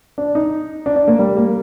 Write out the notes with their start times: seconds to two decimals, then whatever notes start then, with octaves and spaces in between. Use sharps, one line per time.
0.18 D4
0.35 D#4
0.86 D4
0.96 D4
1.08 A#3
1.19 G3
1.37 A#3